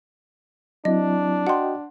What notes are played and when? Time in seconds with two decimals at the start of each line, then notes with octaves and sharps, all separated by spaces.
0.85 F#3 C4 D4 E4 D#5
1.47 F#4 D#5 F#5 G5 C6